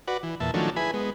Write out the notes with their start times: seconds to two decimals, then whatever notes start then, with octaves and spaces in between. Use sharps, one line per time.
0.08 F#4 B4 D5
0.23 E3
0.40 E2 A#2 E5 A5
0.54 D#3 F3 F#3 A3 C#4 D4
0.76 E4 G#4 B4 G#5 B5
0.94 G#3 B3